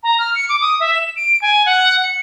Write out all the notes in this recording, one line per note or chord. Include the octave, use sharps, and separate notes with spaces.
A#5
F6
C#7
D6
D#6
E5
E7
D7
G#5
F#5
C#7